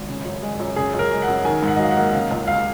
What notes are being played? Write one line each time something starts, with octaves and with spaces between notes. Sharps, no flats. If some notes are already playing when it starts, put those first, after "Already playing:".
Already playing: G#1
C#3
F#2
G#3
F#2
C#3 G#4
F#2 A#4
G#3
F#5
F#2
D#3 G#5
G#2
F#5
D#5
F#3 F5
F#5
A#3
C#3 F5
C#2
G#3 F5